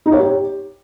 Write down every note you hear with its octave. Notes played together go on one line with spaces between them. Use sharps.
D#4
C#5
G4